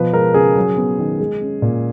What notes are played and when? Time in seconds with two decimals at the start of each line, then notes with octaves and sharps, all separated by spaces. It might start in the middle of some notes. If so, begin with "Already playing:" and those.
Already playing: B2 F3 B4
0.13 G#3 A#4
0.34 C#3 G#4
0.56 F#3
0.77 B3
0.99 D#3
1.20 G#3
1.41 C#4
1.62 A#2